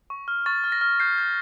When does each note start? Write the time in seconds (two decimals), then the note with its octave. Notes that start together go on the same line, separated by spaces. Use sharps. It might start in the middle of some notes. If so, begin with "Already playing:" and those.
0.10 C#6
0.28 F6
0.46 C#6 A6
0.64 F6
0.72 A#6
0.81 F6
1.00 G6 C7
1.18 G6